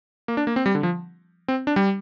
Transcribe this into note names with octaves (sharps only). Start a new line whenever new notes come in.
A#3
D4
A#3
C4
G3
D3
F3
C4
D4
G3